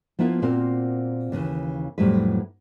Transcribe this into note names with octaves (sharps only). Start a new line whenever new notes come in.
F3 A#3 B3 E4 F4
A#2 A#3 C4 F4 F#4
D#2 C#3 E3
F2 A2 F#3 G3 E4 B4